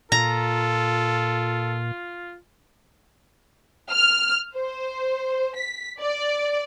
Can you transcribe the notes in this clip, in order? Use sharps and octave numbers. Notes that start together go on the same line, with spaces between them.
A#2 F4 A4 A#5
F6
C5
B6
D5